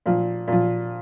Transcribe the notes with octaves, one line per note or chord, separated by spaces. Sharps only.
A#2 F3
A#2 F3